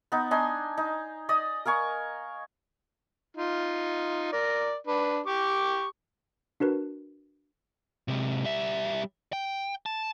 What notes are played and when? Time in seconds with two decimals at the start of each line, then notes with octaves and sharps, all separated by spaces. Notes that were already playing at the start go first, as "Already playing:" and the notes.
0.12 B3 D#4
0.31 D4 D#4 G#5 C6
0.77 D#4
1.29 D5 D#5 D#6
1.65 A#4 F5 G#5 C#6
3.37 D#4 F4
4.32 A#4 D5
4.87 D4 B4
5.26 G4 C#6 D6
6.60 D4 F#4 A#4 B4
8.08 C3 G#3
8.44 G3 E5
9.33 G5
9.86 A5